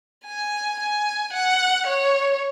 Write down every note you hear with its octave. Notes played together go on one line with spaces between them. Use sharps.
G#5
G#5
F#5
C#5